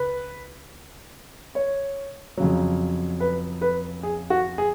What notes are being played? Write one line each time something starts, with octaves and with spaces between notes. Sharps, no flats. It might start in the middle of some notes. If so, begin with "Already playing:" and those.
Already playing: C#2 B4
C#5
F2 C#3 F#3
B4
B4
G#4
F#4
G#4